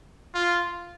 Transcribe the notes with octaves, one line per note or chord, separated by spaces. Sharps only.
F4